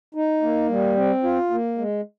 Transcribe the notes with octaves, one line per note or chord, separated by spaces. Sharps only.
D#4
A#3
G3
C4
F4
A#3
G#3